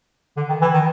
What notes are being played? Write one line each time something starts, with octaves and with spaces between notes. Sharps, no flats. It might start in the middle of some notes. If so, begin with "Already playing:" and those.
D3
D#3
E3
D#3